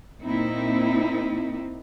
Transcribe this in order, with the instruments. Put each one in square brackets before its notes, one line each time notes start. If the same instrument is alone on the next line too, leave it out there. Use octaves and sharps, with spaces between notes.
[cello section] A#2 A#3 C4 D#4 E4